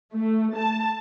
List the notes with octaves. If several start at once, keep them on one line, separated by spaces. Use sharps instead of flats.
A3
A5